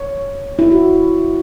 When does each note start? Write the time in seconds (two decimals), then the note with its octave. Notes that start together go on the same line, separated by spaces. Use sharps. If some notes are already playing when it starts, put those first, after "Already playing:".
Already playing: C#5
0.59 E4
0.71 F#4